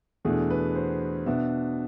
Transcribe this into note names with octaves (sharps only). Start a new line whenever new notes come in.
E2 B2 A3 D4 G#4
B4
C5
B2 B3 D4 E5